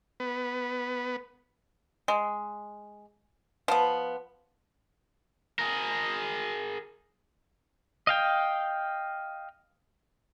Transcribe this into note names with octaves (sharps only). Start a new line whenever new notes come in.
B3
G#3
F3 B3
G#4 A#4
D#5 F5 G5